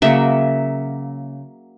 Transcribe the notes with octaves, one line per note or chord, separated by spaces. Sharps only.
C#3 F#3 A#3 E5